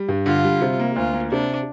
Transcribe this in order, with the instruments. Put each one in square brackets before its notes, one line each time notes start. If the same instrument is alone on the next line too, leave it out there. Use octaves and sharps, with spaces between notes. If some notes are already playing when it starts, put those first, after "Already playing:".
Already playing: [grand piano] G3
G2
[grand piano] D3 [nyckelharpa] F4
[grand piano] G3
C3
A#3
[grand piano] D2 [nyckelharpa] F4
[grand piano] A#3
[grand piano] C3 [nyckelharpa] D4